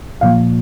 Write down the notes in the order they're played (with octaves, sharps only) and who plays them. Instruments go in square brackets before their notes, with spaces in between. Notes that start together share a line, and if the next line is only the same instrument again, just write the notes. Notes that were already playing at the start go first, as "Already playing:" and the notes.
[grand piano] A#2 F3 F5